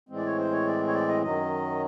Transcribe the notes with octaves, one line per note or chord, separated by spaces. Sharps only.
A2 E3 G#3 C4
D5
C#5
C5
C#5
D5
C#5
D5
D#5
F#2 D#3 F#3 D#5